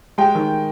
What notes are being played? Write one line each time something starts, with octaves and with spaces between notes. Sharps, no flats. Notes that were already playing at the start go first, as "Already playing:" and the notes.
G#3 G5
D#3